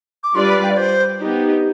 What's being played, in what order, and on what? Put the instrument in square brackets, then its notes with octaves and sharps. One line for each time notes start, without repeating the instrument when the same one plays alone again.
[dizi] D6
[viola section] G3 D4 F4 B4 D5 [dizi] C6
[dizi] B5
G5
D5
C5
[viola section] B3 D#4 G4